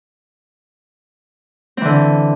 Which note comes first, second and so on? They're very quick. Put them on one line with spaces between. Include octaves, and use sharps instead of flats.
C4 E3 D3